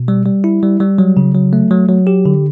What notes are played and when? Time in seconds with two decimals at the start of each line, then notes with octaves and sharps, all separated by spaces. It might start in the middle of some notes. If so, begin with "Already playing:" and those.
Already playing: B2
0.08 G3
0.26 G3
0.44 E4
0.63 G3
0.80 G3
0.98 F#3
1.17 C#3
1.35 F#3
1.53 A3
1.71 F#3
1.89 F#3
2.07 G4
2.26 D3